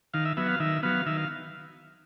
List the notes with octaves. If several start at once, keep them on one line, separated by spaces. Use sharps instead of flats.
D#3 F5
E5
F#3 B3 E5
F5
D#3 E5
F#3 B3 F5
D#3 E5
F5